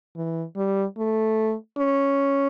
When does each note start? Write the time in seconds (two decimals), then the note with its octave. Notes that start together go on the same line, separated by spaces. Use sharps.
0.16 E3
0.56 G3
0.98 A3
1.78 C#4